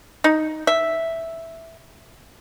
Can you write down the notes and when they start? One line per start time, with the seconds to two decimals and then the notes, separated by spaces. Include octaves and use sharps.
0.24 D#4
0.67 E5